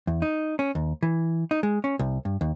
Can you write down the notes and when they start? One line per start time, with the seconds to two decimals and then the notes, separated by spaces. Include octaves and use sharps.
0.07 E2
0.22 D#4
0.59 C#4
0.75 D#2
1.03 E3
1.51 D#4
1.63 G#3
1.84 C#4
1.99 C2
2.25 G2
2.41 D#2